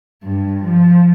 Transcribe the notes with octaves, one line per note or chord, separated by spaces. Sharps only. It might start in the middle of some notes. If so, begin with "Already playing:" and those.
G2
F3